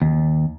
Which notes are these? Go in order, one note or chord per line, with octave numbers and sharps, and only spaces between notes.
D#2